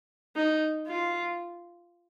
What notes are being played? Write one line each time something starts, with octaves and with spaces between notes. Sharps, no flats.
D#4
F4